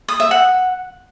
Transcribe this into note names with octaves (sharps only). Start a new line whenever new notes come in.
D#6
E5
F#5